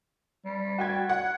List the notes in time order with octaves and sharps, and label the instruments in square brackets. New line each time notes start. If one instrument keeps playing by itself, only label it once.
[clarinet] G3
[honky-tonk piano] F#4 G5 G#6
F#5